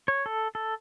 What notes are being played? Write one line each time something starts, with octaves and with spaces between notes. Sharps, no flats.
C#5
A4
A4